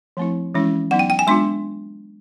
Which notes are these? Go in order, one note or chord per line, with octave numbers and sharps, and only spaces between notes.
F3 A3 C4 E4
E3 G#3 C#4 E4
F#3 B3 D#4 F#5
G5
G5
G#5
G#3 B3 D4 F4 C6